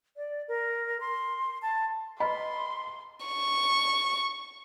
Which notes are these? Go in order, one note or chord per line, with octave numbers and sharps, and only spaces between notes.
D5
A#4
C6
A5
B4 D#5 B5 C6
C#6